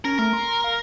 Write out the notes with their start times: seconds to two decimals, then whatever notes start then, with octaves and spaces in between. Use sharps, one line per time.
0.05 C#4 A#4
0.19 A3 A#4
0.33 C6
0.64 F5